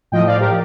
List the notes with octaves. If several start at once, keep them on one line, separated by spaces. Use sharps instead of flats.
A2 F3 D#5 G5
D5 F5
G4 A#4